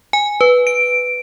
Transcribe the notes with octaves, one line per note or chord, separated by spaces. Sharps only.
G#5
B4
D7